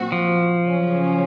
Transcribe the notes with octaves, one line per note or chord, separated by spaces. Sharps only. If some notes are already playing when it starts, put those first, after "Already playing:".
Already playing: A#2 F#3 C4 F#4
F3
C#3 F#3 C#4